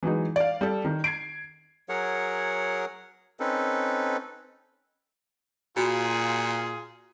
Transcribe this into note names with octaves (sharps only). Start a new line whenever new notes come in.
E3 F#3 G#3 D#4
D5 F5
G3 A4
D#3
G#6 C7 D7
F#3 G#4 A#4 C#5 F#5
C4 C#4 D#4 A4 B4
A#2 F4 F#4 G#4 B5